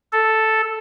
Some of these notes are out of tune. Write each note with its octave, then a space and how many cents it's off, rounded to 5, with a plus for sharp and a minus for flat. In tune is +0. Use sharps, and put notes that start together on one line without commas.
A4 +0